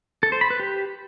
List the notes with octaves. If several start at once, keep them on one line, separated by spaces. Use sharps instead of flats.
A4
C5
B5
B4
G4